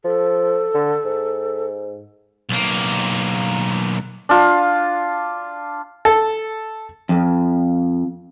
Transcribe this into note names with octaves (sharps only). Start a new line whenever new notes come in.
F3 A4
D3
G#2
B1 A#3
D4 F4
A4
F2